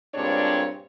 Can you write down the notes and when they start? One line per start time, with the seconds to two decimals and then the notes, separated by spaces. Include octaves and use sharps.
0.15 G2 A#2 G#3 C4 D4 C#5